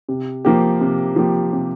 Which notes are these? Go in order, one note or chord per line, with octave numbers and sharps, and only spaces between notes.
C3
F3 A#3 G4
C3
F3 A#3 G4
C3